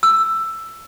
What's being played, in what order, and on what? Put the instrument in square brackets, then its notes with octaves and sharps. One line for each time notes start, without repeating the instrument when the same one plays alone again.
[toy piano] E6